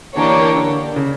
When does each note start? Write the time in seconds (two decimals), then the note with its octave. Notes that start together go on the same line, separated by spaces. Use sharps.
0.16 E3 A#3 D4 G4 A#4 C#5
0.56 D3
0.96 C#3